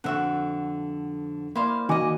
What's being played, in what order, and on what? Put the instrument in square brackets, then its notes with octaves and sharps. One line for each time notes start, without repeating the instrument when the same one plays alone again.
[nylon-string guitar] F2 D3 [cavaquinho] F#4 E5 F#5
[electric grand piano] A#3 D5 [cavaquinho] E4 C5 F5
[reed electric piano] D#3 G#5 D6 [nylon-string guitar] F#4 D#5